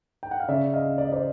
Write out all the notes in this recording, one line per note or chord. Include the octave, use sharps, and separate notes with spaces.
G5
F#5
F5
C#3 D5 E5
D#5 F5
C#3
D5
D#5
C5 D5